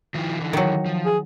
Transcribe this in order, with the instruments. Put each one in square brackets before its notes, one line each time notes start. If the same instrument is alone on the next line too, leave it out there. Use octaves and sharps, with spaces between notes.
[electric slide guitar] D#3 F3 E4
D3 E3
[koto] D#3 F#3
[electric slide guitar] F3
[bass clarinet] G#4